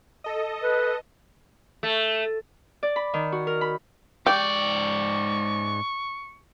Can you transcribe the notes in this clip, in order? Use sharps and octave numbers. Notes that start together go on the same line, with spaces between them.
A4 D#5
B4
A3
D5
B5
D#3
F#4
A#4
B5
G#2 G4 D5 C#6